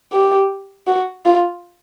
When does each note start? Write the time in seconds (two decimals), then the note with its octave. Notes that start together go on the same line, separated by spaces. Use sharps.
0.12 G4
0.87 F#4
1.25 F4